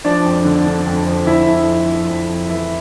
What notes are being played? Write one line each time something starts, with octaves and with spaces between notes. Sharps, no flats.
F3 D4 D5
F2
D3
D3
F2
F3
D3 E4 E5
F2
F3
F3
F2
F2
E3 E4 E5